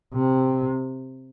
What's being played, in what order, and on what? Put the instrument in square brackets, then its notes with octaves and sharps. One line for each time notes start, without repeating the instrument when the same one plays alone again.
[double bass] C3